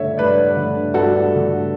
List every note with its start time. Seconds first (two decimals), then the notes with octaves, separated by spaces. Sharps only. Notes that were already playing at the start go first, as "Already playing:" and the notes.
Already playing: G2 D3 A3 C#5 E5
0.18 G2 B4 D5
0.57 D3 A3
0.94 G2 F#4 A4
1.32 D3 A3